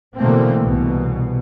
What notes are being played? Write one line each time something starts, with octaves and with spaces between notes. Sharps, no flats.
B2 D3 E3 A3 A#3 C4
C2 B2 E3